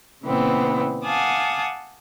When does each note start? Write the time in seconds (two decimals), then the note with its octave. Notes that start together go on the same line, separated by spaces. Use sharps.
0.24 A#2 C#3 E3 B3 C4
1.03 F5 F#5 G#5 A5 D6 D#6